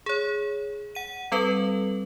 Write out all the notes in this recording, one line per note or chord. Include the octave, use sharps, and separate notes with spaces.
G#4 C#5
F#5 D#7
G3 C4 A4 B4 F#7